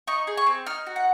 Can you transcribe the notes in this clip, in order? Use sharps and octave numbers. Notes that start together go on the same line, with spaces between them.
D#4 C#6
G#4
C#6
C4
D#4 F6
F#4
F#5